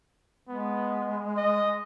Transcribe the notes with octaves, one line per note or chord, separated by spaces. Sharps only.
G#3 B3
D#5